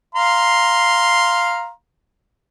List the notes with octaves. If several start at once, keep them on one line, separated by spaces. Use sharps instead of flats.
F5 A#5 C6